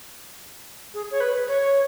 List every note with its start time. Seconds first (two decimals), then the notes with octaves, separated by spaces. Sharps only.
0.94 G#4
1.11 C#5
1.20 B4
1.48 C#5